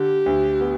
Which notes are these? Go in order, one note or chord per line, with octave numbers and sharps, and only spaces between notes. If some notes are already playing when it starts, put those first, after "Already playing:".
Already playing: D3 G4
D2
B3